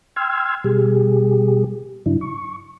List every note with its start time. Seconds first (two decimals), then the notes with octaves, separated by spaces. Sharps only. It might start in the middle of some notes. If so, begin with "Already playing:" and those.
0.16 G5 C6 E6 F6 G#6
0.64 B2 G3 G4 G#4
2.06 G2 C#3 F#3 D4 E4
2.21 C#6